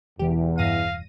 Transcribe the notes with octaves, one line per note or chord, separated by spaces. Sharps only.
E1 E2 E3 G4
G2 F5 A#6 D#7